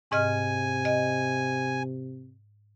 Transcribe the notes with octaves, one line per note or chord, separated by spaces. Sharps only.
G#2 C3 D#5 G#5 F6
D#5